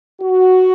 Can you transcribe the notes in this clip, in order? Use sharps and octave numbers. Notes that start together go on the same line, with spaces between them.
F#4